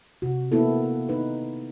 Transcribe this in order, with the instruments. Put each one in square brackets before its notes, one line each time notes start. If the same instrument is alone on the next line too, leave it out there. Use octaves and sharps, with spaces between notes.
[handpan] C3 F#4
A#3 B3 E4 A4
D#4 B4